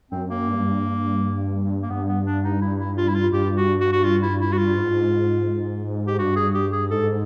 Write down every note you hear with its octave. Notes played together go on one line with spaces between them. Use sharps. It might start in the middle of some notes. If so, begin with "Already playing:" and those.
F#2 C4
A#3
G2
A#3
G2 B3
B3
D4
D#4
E4
E4
F4
E4
F4
G2 G4
F#4
F#4
F#4
F4
E4
E4
F#4
F4
G#2
G4
G2 F#4
G#4
G4
G#4
G#2 A4